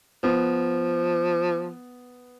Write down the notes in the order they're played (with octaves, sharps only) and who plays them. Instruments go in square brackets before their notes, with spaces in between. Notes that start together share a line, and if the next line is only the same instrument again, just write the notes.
[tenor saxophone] F3 [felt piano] B3